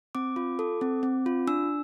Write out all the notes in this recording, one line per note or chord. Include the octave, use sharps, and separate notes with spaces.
C4 D6
F4
A4
C4
C4
F4
D4 E6